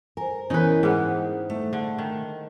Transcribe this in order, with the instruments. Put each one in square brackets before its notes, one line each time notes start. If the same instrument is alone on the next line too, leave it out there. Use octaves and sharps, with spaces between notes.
[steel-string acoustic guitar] A#4 [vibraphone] C5 G#5
[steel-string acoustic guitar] E3 C#4 [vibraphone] B3 A#4 [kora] D#4 B4
[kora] G#2 B3 [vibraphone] C5 [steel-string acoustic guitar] G5
[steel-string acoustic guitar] A3
[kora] D3 [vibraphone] A5
[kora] D#3